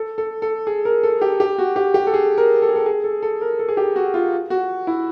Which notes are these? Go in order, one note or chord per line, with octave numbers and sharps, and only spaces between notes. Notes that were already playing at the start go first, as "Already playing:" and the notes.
Already playing: A4
A4
A4
G#4
A#4
A4
G4
G4
F#4
G4
G4
A4
G#4
A#4
A4
G#4
A4
G#4
A4
A4
A#4
A4
G#4
G4
F#4
F4
F#4
E4